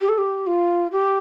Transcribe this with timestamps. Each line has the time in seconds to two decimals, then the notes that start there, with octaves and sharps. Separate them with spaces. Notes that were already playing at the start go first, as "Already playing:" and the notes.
0.01 G4
0.09 A4
0.18 G4
0.47 F4
0.92 G4